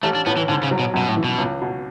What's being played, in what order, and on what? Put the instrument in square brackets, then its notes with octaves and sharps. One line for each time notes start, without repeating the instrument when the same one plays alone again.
[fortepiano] A1 [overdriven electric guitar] A3
[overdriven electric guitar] D4
[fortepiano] A2 [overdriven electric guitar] B3
[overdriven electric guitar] E3
[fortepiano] G#2 [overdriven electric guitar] D3
[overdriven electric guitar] C#3
[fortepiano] F#3
[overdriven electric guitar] B2
[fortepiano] F#2 [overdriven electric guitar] B2
[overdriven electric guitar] A2
[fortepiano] E3
[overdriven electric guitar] B2
[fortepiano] C#2
B2